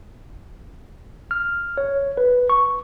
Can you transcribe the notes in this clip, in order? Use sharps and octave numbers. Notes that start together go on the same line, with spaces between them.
F6
C#5
B4
C#6